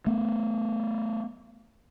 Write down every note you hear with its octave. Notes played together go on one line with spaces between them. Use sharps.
A3 B3